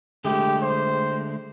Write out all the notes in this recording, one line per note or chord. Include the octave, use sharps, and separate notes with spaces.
D3 G#3 A3 G4
C5